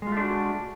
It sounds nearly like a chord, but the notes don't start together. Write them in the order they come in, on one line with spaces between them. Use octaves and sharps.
G#3 F4 A3 D4 F#4